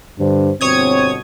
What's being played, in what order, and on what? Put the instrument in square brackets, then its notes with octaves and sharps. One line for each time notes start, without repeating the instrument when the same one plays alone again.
[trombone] G2 [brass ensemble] D3 D4 C5
[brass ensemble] G1 B2 [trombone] C4 [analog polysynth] C#5 D#6 G#6